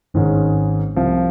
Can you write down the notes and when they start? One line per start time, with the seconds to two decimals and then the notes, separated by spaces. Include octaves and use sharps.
0.14 G#1 G#2 D#3 G#3 C#4
0.96 C2 C3 F3